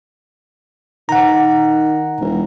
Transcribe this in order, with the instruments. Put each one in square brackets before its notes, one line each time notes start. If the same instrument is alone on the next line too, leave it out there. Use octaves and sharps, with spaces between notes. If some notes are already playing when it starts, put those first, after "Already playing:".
[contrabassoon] D#3 [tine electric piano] F#5 A#5
[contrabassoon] E1